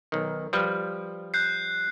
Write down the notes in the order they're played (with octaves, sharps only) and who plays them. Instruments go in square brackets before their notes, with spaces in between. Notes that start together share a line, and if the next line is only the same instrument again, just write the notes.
[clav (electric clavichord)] B1 D#3
F3 G3 B4
[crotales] F#6 G6 C7